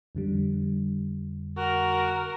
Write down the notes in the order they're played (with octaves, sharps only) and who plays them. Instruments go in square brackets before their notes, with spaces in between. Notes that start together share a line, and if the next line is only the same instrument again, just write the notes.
[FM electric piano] F2 D3 G3
[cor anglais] F#4 [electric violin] A#4